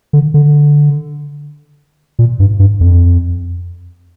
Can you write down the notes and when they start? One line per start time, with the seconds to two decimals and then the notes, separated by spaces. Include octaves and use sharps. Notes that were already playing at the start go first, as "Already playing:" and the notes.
0.13 D3
0.34 D3
2.19 A#2
2.40 G2
2.59 G2
2.81 F2